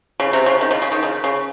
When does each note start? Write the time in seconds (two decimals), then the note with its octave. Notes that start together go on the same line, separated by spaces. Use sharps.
0.20 C#3
0.33 C3
0.46 C#3
0.61 D#3
0.71 C#3
0.82 C#3
0.92 D#3
1.03 C#3
1.24 C#3